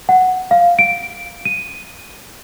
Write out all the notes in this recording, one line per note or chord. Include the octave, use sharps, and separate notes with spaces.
F#5
F5
D7
D#7